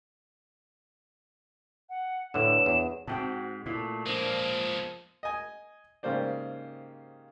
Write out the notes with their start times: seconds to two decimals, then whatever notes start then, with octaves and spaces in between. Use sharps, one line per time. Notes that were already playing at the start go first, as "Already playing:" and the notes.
1.89 F#5
2.34 A2 D3 D4 B4 C#5 E7
2.66 E2
3.07 G#2 C4 F#4 G5 A5
3.66 A#2 A3 E4
4.06 F3 G#3 A#3 D4 A#4
5.23 D#5 G#5
6.03 G#2 C#3 A#3 G4 C5 D5